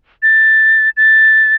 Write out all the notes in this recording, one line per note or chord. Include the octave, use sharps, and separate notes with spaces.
A6
A6